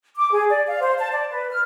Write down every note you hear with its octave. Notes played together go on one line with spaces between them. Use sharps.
D6
G#4
D5
F5
C5
A5
D5
B4
F6